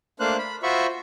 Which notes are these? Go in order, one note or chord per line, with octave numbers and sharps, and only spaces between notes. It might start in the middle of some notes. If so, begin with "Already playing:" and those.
A3 A#3 D4 C5 F5 F#6
B5
F4 F#4 C5 E5 B5 C#6